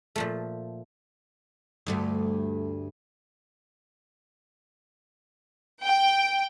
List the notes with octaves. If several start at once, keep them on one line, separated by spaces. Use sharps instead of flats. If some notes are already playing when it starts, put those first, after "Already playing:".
A#2 F3 A3
D2 G2 A3
G5